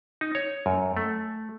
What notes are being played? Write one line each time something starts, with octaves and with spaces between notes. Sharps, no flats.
D#4
C#5
F#2
A3